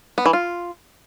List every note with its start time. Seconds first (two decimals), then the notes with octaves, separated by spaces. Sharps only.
0.18 B3
0.26 E3
0.33 F4